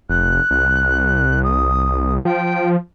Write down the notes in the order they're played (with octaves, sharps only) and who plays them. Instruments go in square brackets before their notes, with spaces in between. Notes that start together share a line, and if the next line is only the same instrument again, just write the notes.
[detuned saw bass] F1 [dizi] F#6
[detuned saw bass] C2
[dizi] D#6
[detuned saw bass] F3 [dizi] G5